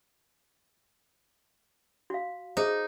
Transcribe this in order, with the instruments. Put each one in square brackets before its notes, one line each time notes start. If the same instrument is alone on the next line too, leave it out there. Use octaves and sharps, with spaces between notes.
[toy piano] F#4 F5
[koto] D#4 [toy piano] G#4 C5